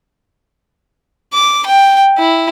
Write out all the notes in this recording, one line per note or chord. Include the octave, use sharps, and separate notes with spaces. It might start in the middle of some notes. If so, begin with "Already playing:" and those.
D6
G5
E4